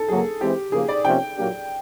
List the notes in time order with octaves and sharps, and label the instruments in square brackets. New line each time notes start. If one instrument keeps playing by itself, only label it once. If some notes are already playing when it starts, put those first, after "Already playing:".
Already playing: [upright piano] A4
[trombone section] F#2 C#3 F#3 A#3 [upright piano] G#4
[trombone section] E3 G#3 C4 [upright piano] G4
[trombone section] C#3 F3 A#3 [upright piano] G#4
[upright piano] D5
[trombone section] C3 F3 A#3 C#4 [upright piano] G5
[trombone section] A#2 F#3 A#3 D4 G4